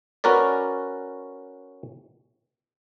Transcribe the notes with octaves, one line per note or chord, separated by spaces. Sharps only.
C#4 F#4 A#4 B4 D5